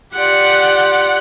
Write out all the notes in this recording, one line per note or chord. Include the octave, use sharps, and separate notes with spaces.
F4 G4 D5 F#5